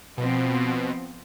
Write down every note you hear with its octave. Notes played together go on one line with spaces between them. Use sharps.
B2 F3 B3 C4